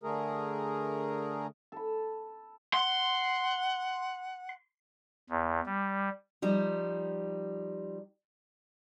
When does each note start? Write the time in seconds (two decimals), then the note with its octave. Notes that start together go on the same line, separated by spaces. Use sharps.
0.03 D3 A3 G#4 A#4
1.72 A4 B5
2.74 F#5 C6
5.30 E2
5.66 G3
6.42 F3 G3 D#4